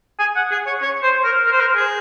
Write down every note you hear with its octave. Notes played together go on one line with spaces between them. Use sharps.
G#5
F#5
G#4
C#5
C#5
C5
A#4
A#4
C5
A#4
G#4